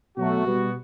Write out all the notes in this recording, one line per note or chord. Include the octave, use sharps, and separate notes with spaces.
B2 F#3 A3 F#4
B2 G3 B3